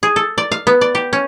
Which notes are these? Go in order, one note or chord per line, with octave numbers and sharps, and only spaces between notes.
G#4
A4
D5
F5
B3
D5
G4
C#4